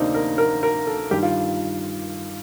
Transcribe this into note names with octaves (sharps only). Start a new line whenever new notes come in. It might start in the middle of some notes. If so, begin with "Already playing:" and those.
Already playing: D2 C3 D#3 A#3 C4 D4 D#4
A#4
A#4
A#4
A4
G2 D#3 G4
F4